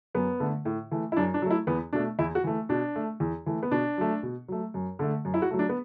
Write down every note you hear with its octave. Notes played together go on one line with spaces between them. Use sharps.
F#2 B3
D3 A3
A2
E3 A3
E4
F#2 D4
D4
F#3 A3
E4
E2 B3
B2 A3 D4
E2 E4
F#4
E3 A3
B2 D4
A3
E2
E3 A3
B3
B2 D4
F#3 A3
B2
F#3 A3
F#2
D3 A3
F#2
E4
F#4
F#3 A3
D4
B3